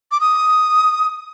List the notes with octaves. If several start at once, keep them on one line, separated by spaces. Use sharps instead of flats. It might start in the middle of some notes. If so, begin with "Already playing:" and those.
D6
D#6